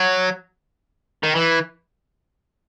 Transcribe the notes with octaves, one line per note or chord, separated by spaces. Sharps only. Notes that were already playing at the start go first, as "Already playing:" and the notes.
Already playing: F#3
D#3
E3